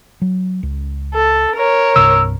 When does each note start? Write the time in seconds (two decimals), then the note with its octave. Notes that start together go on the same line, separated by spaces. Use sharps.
0.22 F#3
0.63 C#2
1.14 A4
1.55 A#4 C#5
1.96 C2 G2 C3 E6